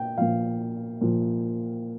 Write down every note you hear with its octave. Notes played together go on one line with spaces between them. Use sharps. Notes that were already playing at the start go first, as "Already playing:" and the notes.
Already playing: A#2 G5
A#2 F3 F5
A#2 F3